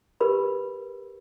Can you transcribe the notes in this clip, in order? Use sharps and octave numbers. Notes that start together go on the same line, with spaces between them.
G4 A#4 B4 B5